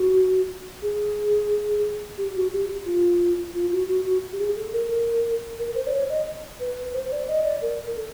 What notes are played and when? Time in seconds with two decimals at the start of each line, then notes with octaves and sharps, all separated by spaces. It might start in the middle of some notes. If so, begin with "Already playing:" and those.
Already playing: F#4
0.82 G#4
2.18 G4
2.35 F#4
2.52 G4
2.86 F4
3.54 F4
3.72 F#4
3.89 F#4
4.06 F#4
4.33 G4
4.40 G#4
4.56 A4
4.73 A#4
5.59 A#4
5.75 C5
5.87 D5
5.92 C#5
6.09 D#5
6.60 B4
6.94 C5
7.11 D5
7.28 D#5
7.45 D5
7.62 A#4
7.96 A4